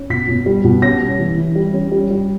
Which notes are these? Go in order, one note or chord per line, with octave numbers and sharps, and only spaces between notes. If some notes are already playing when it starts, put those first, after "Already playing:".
Already playing: C#4
B2 B6
B2
G3
B2
C#4 A#6
G3
E3
E3
G3
C#4
G3
G3